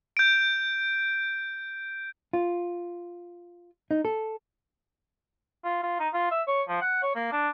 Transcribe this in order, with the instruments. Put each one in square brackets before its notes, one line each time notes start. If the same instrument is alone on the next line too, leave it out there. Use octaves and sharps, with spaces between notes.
[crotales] G6 D7
[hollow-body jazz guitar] F4
D#4
A4
[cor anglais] F4
F4
D#4
F4
E5
C#5
F3
F#5
C#5
A#3
D4